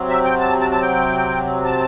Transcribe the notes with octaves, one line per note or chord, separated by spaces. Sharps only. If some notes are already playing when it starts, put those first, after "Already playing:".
Already playing: C3 F#3 C4
E5
G5
A5
A5
A5
G5
A5